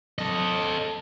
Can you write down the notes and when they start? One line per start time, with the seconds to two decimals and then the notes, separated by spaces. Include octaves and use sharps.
0.19 A4 D#5